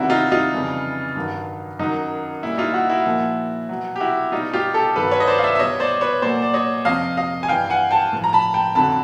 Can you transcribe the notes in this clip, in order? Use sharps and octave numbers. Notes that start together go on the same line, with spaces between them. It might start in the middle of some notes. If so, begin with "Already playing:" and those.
Already playing: E2 C3 D#3 G3 E4 F#4
D#4 F4
D#4 F4
F2 C#3 E3 G3
G2 D#3 F#3
F#2 D#3 F#3 D#4
A#2 G3 E4
D#4 F4
E4 F#4
E4 F#4
A#2 F3
B2 F#3
G4
E4 F#4
B2 G3 D#4 F4
F4 G4
G4 A4
G2 D#3 F#3 A4 B4
B4 C#5
D#5
C5 D5
F5
D5 E5
E5
E2 B2 G3 C#5 D#5
C5 D5
B4 C#5
A#2 F#3 C5 D5
D5
C#5 D#5
F2 C3 F3 D#5 F5
D#5 F5
G#5
G2 E3 G3 F5 G5
F#5 G#5
G5 A5
A2 F3
A#5
A5 B5
G5 A5
F2 D3 F#3 A5 B5